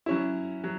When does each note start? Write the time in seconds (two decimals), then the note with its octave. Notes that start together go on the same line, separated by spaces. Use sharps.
0.06 F#3 C#4 E4
0.64 F#3